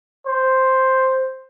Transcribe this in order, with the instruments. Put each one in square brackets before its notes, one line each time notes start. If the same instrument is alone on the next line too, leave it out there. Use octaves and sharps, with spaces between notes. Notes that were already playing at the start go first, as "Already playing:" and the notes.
[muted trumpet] C5